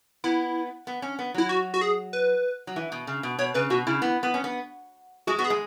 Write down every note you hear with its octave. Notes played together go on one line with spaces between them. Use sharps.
B3 E4
B3
C#4
B3
F#3 E4
F#4
F#4
G#4
B4
F#3
E3
B2
C#3
B2
B2 C#5
C#3 B4
B2 F#4
C#3 E4
B3
B3
C#4
B3
G#3 F#4
B3 F#4
G#4
G#3